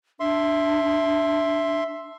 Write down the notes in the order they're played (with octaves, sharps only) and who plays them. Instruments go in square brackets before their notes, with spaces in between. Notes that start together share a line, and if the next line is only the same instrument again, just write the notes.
[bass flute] D4 [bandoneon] E5 C6